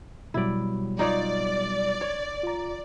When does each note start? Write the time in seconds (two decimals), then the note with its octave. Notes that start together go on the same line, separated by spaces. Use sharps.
0.34 B2 F#3 G3 E4 D5
0.99 D#4 F4 C#5 D5
2.01 C#5
2.43 F4 A#5